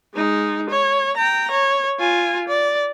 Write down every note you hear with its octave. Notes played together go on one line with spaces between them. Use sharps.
G#3 D#4
C#5
G5 A#5
C#5
F4 G#5
D5